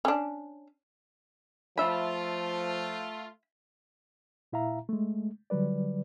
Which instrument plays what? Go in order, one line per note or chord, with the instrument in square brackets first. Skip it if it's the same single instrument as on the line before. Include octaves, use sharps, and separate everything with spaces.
[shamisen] C#4 D4
[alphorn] F3 [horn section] A3 F4 [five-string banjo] E5 B5
[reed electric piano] A#2 E4 E5 F5 A#5
G#3 A3
D3 F#3 G3 B4 D5